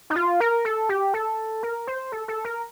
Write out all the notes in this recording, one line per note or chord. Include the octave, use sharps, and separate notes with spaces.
D#4
F4
A#4
A4
G4
A4
A#4
C5
A4
A4
A#4